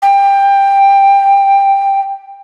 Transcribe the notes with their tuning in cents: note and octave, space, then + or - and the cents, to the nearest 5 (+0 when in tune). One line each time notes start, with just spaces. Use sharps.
G5 +15